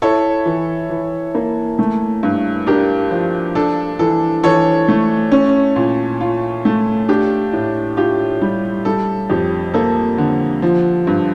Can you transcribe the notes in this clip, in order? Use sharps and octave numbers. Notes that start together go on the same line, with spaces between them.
E4 A4 C#5
E3
E3
A#3
A3
G2
D4 G4 A#4
F3
D4 A4
E3 A4
E3 A4 C#5
A3
C#4
A#2
F4
A3
D4 G4
A2
F4 G4
G3
G3 A4
F2 G4
A#3 A4
D3
F3
G2